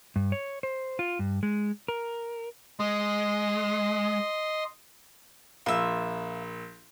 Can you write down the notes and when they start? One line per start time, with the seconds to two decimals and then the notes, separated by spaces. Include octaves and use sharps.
0.16 G2
0.32 C#5
0.63 C5
0.99 F4
1.19 G2
1.43 G#3
1.88 A#4
2.80 G#3 D#5 C6
5.66 A#1 F4 E5 E6